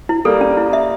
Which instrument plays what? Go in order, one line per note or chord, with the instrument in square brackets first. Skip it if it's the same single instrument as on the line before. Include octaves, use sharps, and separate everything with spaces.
[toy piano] E4
[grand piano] G3 A#3 [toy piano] A4
[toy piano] C#4
E4
E5